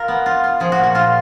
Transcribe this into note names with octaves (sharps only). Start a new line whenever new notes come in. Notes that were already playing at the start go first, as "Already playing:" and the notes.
Already playing: F4 A#4
B3
F4
F4
F3 G#4
F#4
A#2
F#4
A#2 F4